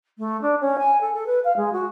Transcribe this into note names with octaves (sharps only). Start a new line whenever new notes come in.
A3
D4
C#4
G#5
A4
A4
B4
F5
G#3
F#4